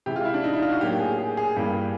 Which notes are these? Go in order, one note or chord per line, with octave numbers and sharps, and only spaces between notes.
C3 E3 G#3 G4
F4
E4
D4
D#4
E4
F4
F#4
A2 F#3 A#3 G4
G#4
G#4
G#4
G2 E3 G3 A#3